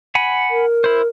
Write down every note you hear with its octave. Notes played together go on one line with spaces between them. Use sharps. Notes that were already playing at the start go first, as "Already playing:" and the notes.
F#5 G#5 B5
A#4
E4 C5